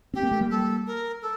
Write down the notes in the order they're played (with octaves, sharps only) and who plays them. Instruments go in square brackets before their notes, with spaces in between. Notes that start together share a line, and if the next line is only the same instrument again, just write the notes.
[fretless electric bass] C4 [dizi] G4
[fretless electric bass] A#3
A3
G3 A#3
[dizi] A4
A#4
A4